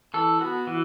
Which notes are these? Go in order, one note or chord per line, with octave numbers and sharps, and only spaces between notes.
E3 A4
B3 F#4
E3